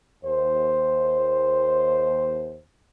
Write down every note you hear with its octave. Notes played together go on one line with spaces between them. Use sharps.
D#2 C5